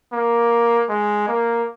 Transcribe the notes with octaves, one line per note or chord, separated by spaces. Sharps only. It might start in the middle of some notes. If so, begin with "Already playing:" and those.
A#3
G#3
A#3